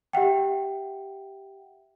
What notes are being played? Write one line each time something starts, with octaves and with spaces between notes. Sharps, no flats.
G4 E5 F#5 G5